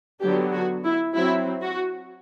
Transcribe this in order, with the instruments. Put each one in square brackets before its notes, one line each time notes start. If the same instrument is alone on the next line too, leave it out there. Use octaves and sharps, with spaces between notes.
[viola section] D3 F#3 B3 D4 G4
F#4
E4
F#3 C4 E4
F#4